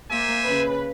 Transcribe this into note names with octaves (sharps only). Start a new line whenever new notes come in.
A#3 C5 E5 G#5
C#3 B4